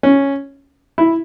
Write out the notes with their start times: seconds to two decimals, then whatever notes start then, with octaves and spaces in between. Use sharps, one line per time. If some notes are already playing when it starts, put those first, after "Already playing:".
0.03 C#4
0.98 E4